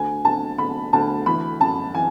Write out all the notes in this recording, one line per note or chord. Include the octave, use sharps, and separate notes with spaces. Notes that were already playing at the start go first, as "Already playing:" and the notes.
Already playing: D2 G#5
D2 A5
D2 B5
D2 A5
E3 B5
F#2 A5
E3 G#5